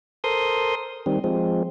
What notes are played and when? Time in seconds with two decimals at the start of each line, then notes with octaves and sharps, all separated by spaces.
0.24 A4 A#4 C5 C6 D#6
1.06 D#3 G3 C4
1.24 F3 G#3 C4